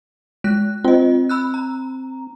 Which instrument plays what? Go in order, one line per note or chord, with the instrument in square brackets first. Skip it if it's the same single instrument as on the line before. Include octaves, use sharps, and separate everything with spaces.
[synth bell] G#3 F#6
[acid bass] C4 [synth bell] F4 D#5
[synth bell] B5 E6 F#6
A#5